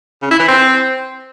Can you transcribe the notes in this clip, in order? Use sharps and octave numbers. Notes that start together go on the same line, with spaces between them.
C#3
E4
E3
C4